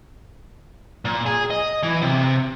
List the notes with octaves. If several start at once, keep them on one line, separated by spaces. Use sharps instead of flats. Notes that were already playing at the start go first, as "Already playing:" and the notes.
A#2
G#4
D#5
E3
C3